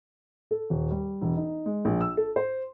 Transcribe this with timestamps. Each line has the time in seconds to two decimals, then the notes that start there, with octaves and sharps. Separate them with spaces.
0.51 A4
0.70 D#1
0.91 G3
1.21 E1
1.36 D#4
1.66 G#3
1.85 A#1
2.01 E6
2.17 A4
2.36 C5